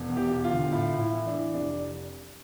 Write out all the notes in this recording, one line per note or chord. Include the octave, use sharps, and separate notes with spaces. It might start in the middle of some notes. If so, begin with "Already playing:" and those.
Already playing: E1
E2
G4
E1
F4
D3
A2 F4
A2
E4
E3
D4
E3
F1 D4